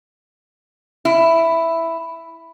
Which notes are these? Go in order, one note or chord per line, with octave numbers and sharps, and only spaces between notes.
E4